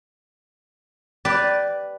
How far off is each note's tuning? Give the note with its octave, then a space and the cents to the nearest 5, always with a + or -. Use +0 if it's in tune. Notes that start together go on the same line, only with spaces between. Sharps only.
G4 -20 B4 +0 D5 +0